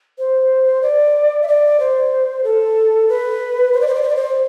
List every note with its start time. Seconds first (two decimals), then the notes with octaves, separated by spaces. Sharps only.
0.18 C5
0.82 D5
1.42 E5
1.48 D5
1.80 C5
2.44 A4
3.09 B4
3.73 C5
3.81 D5
3.88 C5
3.95 D5
4.02 C5
4.09 D5
4.16 C5